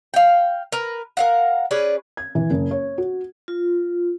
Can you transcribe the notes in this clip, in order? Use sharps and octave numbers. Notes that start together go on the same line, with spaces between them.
F5 G5
A#4 B4
A#4 F5 F#5
C#4 G#4 B4 D5
G#6
E3
F#1
C#5
F#4
F4